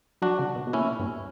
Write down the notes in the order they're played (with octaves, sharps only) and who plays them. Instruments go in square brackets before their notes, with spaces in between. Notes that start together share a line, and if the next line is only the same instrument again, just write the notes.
[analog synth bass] F#3 [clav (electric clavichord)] D4 F#4
[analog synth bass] C#3
B2
B2
[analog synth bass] A#2 [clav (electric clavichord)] C#4 E4
[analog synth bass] G2